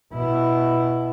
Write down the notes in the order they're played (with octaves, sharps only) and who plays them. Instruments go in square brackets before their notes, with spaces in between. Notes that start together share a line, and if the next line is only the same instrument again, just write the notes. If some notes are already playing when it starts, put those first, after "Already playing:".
[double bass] B2 E4